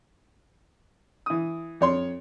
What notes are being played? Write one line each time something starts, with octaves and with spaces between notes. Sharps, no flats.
E3 D#6
F2 C#5 C6